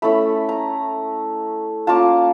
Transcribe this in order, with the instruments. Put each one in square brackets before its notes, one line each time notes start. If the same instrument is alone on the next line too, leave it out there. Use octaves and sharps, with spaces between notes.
[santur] A3 C#4 E4 B5
A#5
A#3 C#4 F4 A5